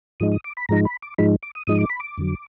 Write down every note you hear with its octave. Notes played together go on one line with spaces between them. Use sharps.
G#2 F3 G#3 D#4 D#6
D#6
D6
B5
G#2 F3 G#3 D#4 A#5
B5
D6
G#2 F3 G#3 D#4 B5
D6
D#6
G#2 F3 G#3 D#4 D#6
D6
B5
D6
F2 D3 F#3